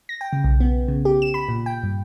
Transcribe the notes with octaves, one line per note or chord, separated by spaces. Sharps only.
A#6
G5
C#3
B1
B3
C#3
G4
E7
B5
A#2
G5
G2